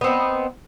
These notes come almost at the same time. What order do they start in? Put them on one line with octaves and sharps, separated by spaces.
B3 C4 D#4